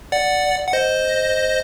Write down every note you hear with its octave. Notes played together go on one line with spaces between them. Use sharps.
D5 F#5
F#5
C5 D#5